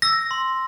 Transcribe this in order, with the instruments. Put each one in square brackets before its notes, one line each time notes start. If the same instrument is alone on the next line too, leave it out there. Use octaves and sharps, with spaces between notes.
[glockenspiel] E6 A#6
C6